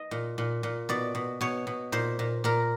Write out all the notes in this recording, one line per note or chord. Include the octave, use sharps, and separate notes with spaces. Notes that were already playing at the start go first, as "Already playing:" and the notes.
Already playing: D#5
A#2
A#2
A#2
B2 D5
B2
B2 C#5
B2
A#2 C5
A#2
A#2 A#4